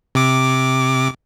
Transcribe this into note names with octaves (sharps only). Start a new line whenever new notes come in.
C3 D6